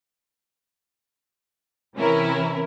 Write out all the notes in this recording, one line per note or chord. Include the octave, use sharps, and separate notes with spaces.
C3 E3 C#4 E4 A#4